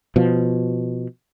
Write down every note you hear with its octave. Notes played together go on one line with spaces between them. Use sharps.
B2 F3